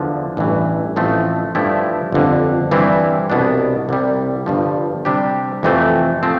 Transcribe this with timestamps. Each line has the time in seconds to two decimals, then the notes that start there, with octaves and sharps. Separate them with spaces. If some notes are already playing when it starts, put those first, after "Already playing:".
Already playing: E2 D3 F3
0.37 A1 G2 E3
0.96 A1 A2 F3 A3 C4
1.55 G2 F3 A3 E4 G4
2.12 G1 F2 D3
2.71 G2 E3 G3 C4 E4
3.30 C2 B2 B3 D4
3.89 C2 C3 G3
4.46 G1 G2 F3
5.05 C3 G3 D4 G4
5.63 F2 C3 E3 A3 C4
6.23 F3 A3 C4